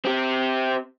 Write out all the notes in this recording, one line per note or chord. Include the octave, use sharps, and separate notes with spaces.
C4 G4